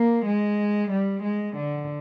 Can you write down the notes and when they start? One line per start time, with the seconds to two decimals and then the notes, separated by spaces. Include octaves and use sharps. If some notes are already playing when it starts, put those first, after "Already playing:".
Already playing: A#3
0.26 G#3
0.91 G3
1.23 G#3
1.56 D3